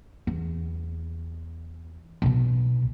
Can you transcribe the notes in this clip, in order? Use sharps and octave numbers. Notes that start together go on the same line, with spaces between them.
E2
B1 B2